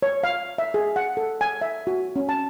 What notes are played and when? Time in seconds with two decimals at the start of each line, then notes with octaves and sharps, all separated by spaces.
0.02 C#5
0.23 F5
0.58 E5
0.74 G#4
0.96 F#5
1.17 A4
1.41 G#5
1.61 E5
1.87 F#4
2.16 C#4
2.29 A5